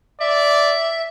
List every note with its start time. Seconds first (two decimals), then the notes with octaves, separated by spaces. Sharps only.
0.21 D5 E5